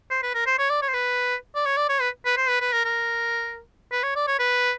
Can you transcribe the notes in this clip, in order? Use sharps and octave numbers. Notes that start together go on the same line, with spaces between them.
C5
B4
A#4
C5
C#5
D5
C#5
C5
B4
D5
C#5
D5
C#5
B4
B4
C5
B4
B4
A#4
A#4
B4
C#5
D5
C#5
B4